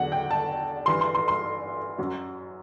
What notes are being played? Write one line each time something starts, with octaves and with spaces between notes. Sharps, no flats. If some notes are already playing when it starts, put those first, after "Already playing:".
Already playing: E2 D3 F#3 F#5
G5
A5
G2 E3 C6
C6
C6
C6
F#2 F#3